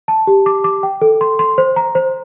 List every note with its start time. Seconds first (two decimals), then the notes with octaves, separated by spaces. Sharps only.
0.08 A5
0.27 G4
0.46 D6
0.64 D6
0.83 G5
1.02 A4
1.21 C6
1.39 C6
1.58 C5
1.76 A#5
1.95 C5